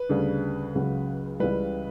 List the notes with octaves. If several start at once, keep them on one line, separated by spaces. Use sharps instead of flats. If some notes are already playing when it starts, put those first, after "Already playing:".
Already playing: B4
D2 C#3 G3
C#2 C#3 F#3
C#2 C#3 E3 G3 B4